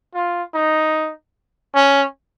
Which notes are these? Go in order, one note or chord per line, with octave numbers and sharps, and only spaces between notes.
F4
D#4
C#4